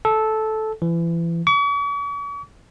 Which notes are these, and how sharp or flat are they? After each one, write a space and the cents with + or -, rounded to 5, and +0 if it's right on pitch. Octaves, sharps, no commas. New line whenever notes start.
A4 -10
E3 +30
C#6 +45